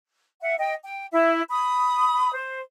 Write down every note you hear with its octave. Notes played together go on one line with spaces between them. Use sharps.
E5 F#5
D#5 G5
G5
E4 E5
B5 D#6
C5